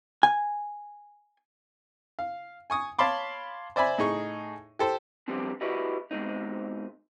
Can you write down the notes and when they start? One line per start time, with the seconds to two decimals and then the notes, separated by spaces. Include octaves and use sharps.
0.23 G#5
2.19 F5
2.70 G#5 C#6 D#6
2.99 C#5 F5 A5 B5 C6 D6
3.76 C5 D5 E5 G#5 B5
3.98 A2 D#4 G#4 C#6
4.79 G4 A4 C5
5.28 F3 G3 B3 C4 D4
5.61 E4 F#4 G4 B4 D5 D#5
6.11 G#2 B2 G#3 C4 D#4